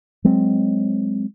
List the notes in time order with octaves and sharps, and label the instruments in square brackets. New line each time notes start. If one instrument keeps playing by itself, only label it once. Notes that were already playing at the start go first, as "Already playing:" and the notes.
[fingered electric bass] F#3 G#3 C4